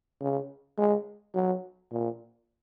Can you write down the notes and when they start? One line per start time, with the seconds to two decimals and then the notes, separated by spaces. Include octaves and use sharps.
0.21 C#3
0.78 G#3
1.35 F#3
1.92 A#2